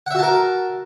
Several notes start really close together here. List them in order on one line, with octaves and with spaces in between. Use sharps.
F#5 E5 F#4 A5 A#4